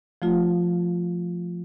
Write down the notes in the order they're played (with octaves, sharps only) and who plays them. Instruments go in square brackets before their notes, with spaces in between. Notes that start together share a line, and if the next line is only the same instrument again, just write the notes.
[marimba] F3 A3 F4